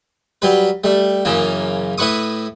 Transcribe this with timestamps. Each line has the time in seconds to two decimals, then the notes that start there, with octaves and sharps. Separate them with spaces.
0.42 F#3 G3 B4
0.84 G3 A3
1.25 F#2 C#3 E3 A#3
1.98 A2 E4 B4 C#6 D#6